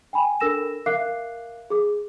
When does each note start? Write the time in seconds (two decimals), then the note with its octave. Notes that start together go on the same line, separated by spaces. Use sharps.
0.13 G5 G#5 B5
0.40 D4 A4 A#4 E6 A#6 E7
0.86 A#4 E5 F5 D6 F#6 C7
1.70 G#4 D6